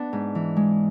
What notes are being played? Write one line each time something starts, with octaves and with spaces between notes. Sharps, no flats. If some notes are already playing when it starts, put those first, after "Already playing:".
Already playing: B3 D4
G#2
E3
G#3